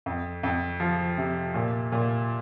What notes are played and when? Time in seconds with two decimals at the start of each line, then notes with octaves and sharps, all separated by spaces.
0.06 F2
0.43 F2
0.80 F3
1.18 C3
1.54 A#2
1.92 A#2